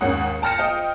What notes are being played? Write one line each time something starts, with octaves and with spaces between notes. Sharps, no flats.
D#2 G#2 C#4 F#5 D#6
G5 A5 F6 A#6 C#7 E7
F4 C5 D#5 G5